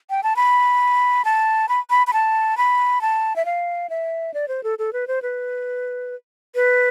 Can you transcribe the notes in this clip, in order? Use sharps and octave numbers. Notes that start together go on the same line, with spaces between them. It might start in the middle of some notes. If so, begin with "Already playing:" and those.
G5
A5
B5
A5
B5
B5
B5
A5
B5
A5
E5
F5
E5
D5
C5
A4
A4
B4
C5
B4
B4